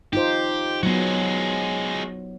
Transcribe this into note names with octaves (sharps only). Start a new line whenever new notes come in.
D#4 F4 G4 C5
F#3 G#3 B3 F#4